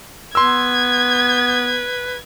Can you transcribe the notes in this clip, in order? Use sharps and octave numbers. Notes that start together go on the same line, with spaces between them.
B3 B4 C6 E6 G#6